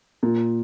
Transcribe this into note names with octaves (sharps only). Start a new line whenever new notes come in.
A#2